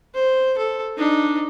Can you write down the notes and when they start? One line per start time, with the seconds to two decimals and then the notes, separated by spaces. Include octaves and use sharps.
0.15 C5
0.58 A4
0.97 D4 D#4